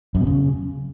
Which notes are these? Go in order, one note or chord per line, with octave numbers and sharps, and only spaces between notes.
F#2
B2
C#3